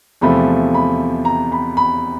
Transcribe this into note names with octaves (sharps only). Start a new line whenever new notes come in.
E2 C3 F3 A3 B5
B5
A#5
B5
B5